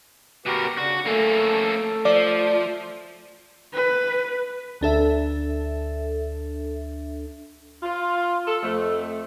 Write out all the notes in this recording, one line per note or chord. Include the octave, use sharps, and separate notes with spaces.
B2 F#4 G4 A#4 B4
C#3 D4 F#4
A3 A#3 C#4 A4
F3 D5
B4
D2 D4 A4 E5
F4
A4
F2 A3